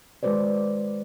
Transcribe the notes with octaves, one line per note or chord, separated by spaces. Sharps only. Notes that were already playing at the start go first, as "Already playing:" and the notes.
D#3 G#3 F#4 B4 C5 D5